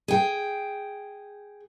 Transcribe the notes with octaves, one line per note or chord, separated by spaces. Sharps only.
G#4 G5